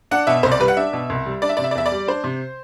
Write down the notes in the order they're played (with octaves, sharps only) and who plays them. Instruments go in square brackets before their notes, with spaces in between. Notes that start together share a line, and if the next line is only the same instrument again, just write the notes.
[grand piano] D4 [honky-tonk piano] F#5
[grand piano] B2 [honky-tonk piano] E5
[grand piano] C2 [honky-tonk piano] C5
[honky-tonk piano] D5
[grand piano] G3 [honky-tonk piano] B4
[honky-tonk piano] F#5
[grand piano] D4 [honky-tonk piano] E5
[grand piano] B2
C2
G3
[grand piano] D4 [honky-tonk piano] D5
[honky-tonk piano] E5
[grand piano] C3 [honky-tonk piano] D5
[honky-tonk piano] E5
D5
[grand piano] E2 [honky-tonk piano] E5
[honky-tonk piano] D5
[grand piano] G3
[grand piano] D4 [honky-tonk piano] C5
[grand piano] C3